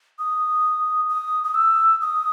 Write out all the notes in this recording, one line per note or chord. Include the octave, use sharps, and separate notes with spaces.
D#6
D#6
D#6
E6
D#6